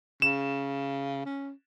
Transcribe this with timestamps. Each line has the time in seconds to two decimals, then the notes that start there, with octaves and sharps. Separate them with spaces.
0.22 C#3 E7
1.25 C#4